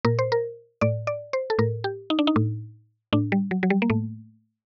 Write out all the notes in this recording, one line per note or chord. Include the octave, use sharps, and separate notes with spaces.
A#2 A#4
C5
A#4
A2 D5
D5
C5
A4
A2 A#4
G4
D#4
D4
D#4
A2
A2 D4
G3
F#3
F#3
G3
A#3
A2 A3